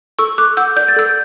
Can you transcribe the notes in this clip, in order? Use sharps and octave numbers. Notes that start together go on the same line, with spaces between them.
A4 C#6 E6
A4 D6 F#6
F#5 E6 G6
D5 G6
A6
A4 E6 G6